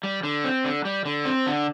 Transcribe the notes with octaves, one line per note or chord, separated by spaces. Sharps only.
G3
D3
C4
D3
G3
D3
C4
D3